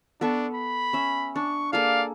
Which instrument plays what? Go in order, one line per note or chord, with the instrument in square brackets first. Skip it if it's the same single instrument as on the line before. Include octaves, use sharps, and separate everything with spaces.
[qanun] B3 A4 C#6 [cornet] D4
[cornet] B5
[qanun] C#4 E5
[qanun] D4 [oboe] C#6
[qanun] A#3 G#4 A4 [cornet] D5 [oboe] F5